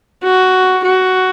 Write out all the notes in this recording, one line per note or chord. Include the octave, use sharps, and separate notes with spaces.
F#4
F#4